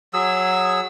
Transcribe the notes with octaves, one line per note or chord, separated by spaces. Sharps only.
F#3 G#4 E6